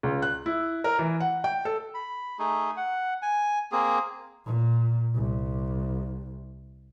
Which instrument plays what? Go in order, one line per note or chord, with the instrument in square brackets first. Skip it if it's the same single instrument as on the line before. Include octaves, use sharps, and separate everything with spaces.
[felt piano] C#2
F#6
E4
A#4
E3
F#5
G5
A4
[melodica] B5
A3 D#4 G#4
F#5
G#5
A#3 C4 G#4
[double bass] A#2
C2